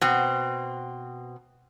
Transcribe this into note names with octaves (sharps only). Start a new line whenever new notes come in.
B2 C4